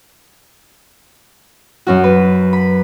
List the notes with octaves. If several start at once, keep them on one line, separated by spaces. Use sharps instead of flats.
F#2 C#4 F#4
B4
B5